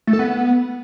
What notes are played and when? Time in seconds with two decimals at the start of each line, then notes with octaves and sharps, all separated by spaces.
0.07 A3
0.13 A4
0.19 B3